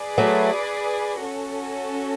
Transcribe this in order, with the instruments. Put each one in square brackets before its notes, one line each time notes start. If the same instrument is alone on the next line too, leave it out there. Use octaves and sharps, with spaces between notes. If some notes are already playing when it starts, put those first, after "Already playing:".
Already playing: [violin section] G#4 B4 D5
[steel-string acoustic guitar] F#3 A3
[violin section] C#4 F#4 A4